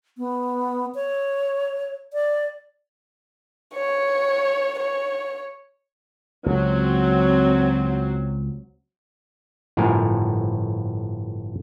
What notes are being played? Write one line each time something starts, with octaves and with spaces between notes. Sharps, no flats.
B3
C#5
D5
C#5
C#5
C#2 F#3 C4
G1 A2 F3 A#4 G#5